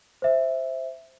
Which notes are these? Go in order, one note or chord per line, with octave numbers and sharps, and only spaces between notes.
C5 E5